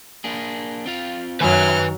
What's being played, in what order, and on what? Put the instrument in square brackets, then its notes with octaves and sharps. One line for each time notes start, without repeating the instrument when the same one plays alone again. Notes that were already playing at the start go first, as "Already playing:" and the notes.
[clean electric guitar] A#3 D4 G#4
C4 F4 F5
[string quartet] F#2 F#3 F6 [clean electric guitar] D#3 [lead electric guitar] B4 G#5